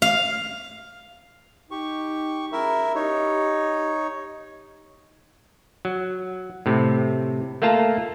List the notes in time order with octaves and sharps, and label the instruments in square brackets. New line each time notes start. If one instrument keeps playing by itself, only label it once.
[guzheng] F5
[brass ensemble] D#4 [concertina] G4 C#6
[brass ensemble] F#3 G#3 C#4 [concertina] E4 A#4 E5
[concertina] D#4 C#5 [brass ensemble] G4
[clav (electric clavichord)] F#3
A2 C3
A3 A#3 F4 A5 A#5